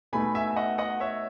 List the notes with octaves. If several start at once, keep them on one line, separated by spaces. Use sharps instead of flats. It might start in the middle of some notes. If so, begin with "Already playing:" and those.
B2 A3 D#4 G#5 B5
E5 G#5
E5
D#5 F#5
D#5 F#5
C#5 E5